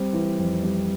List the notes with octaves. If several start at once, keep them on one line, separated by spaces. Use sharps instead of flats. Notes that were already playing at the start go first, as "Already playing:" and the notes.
Already playing: G3 C4
E3
F2
G3